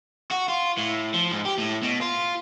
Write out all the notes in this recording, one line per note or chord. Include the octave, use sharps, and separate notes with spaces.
F#4
F4
A2
F3
G#2
G4
A2
B2
F4